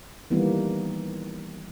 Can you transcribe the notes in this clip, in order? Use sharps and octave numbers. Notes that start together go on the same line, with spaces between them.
D#3 E3 G3 A#3 B3